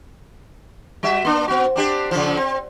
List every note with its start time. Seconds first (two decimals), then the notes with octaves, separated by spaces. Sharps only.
1.03 G3 F#4 E5
1.25 A#3 D4
1.48 B3 F#4
1.76 C4 D4 G4
2.11 C#3 F3
2.37 C4